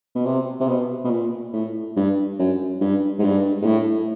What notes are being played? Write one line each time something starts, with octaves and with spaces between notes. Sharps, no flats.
B2
C3
C3
B2
B2
A#2
A2
G2
F#2
G2
G#2
G2
G#2
A2